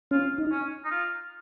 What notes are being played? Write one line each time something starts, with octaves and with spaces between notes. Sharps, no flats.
C#4 F4
D#4
C#4
D#4
F4